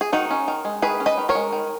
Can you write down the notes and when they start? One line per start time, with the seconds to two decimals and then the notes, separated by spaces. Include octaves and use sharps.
0.01 G#4
0.12 D#3 D#4 F#4
0.31 C#4
0.48 D#3
0.65 G#3
0.82 D#3 G#4 B4
1.00 C#4
1.06 B4 D#5
1.18 D#3
1.29 A#4 C#5
1.35 G#3
1.52 D#3